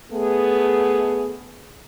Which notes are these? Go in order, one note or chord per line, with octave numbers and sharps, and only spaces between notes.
A3 B3 G#4